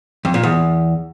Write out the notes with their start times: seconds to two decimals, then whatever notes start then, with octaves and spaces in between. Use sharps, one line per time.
0.25 F2
0.34 A#2
0.43 E2